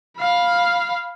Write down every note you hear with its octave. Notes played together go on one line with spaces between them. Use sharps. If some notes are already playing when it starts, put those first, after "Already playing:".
F5 B5